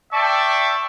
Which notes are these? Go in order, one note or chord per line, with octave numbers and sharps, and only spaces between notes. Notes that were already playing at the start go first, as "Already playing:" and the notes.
D5 E5 G5 A5 C#6 D6